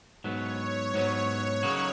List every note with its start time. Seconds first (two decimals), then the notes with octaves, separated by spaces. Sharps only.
0.24 G#2 F#3 B3 C#5
0.94 G#2 F#3 B3
1.63 C#3 F#3 A#3 D#4 F#4